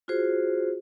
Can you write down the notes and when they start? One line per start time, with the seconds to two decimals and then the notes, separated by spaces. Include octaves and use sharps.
0.08 F4 F#4 G#4 C5